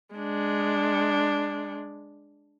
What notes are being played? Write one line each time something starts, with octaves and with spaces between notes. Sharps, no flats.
G#3 D4